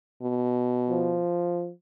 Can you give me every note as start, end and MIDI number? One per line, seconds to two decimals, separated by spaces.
0.23 1.21 47
0.90 1.70 53